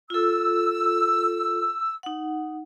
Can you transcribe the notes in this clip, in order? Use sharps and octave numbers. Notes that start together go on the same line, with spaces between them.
F4 A4 E6
D#4 F#5